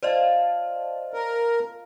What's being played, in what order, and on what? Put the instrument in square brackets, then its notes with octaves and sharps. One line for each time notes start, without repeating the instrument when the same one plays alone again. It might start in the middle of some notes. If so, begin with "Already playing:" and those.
[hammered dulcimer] F4 A5 [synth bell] C5 D5 D#5
[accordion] A#4